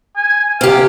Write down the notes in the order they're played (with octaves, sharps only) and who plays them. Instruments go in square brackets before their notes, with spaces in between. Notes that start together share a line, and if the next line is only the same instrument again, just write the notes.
[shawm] G#5
[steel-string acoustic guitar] C3 G4 [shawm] F5